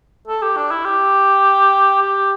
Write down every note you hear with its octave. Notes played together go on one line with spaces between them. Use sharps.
A4
G4
D4
E4
G4
G4